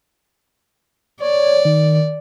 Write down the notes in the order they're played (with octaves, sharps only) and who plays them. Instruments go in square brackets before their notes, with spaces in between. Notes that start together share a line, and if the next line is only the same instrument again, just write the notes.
[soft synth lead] C#5 [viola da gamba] D5
[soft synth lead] D#3